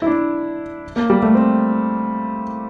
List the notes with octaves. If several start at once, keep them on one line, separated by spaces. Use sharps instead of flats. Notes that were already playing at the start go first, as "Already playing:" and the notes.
E4
D4
A#3
G3
A3
C4